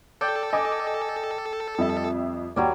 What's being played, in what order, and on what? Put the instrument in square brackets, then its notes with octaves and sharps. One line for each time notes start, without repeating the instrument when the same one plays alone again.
[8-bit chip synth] A4 [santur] D5 G5
[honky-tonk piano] D#5 G#5 D6
F2 G3 E5
[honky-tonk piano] D#2 [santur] F#3 G3 D5